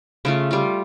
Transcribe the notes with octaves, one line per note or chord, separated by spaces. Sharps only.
C#3 A3 F4
G3 F4